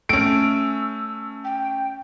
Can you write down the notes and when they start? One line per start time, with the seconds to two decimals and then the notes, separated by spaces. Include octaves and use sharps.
0.09 A3 C#4 E6 D7
1.44 G5